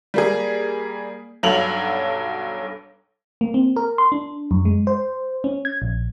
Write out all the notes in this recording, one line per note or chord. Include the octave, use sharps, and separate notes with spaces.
G3 A#3 G#4
B1 G2 F#3 A4 F7 F#7
A#3
C4
A#4
C6
D4
F#2
G#3
C5
C#4
G#6
A#1